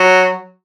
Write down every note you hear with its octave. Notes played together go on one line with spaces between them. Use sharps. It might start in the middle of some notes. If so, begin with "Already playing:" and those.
Already playing: F#3